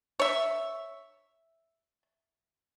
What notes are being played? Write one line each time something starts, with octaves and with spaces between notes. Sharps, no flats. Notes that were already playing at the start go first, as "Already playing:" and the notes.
C#5 E5